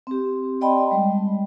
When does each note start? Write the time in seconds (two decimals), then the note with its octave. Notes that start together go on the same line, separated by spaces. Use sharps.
0.07 C4 G4
0.61 D5 D#5 G5 A5 B5 C6
0.91 G3 G#3